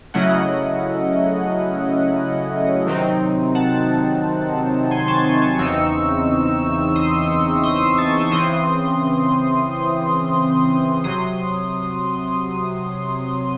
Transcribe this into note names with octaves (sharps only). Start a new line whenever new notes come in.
C#3 F#3 A3 C#4 E4 D#5 F#5
C3 D#3 F#3 C4 D#4
F#5 A5
G#5 C6
A5 C#6
G#5 C6
A5 C#6
E2 C#3 E3 C4 D#4 C#6 E6
C6 D#6
C6 D#6
A5 C#6
C#6
C#3 E3 C4 C6 D#6
C3 F#3 C6 D#6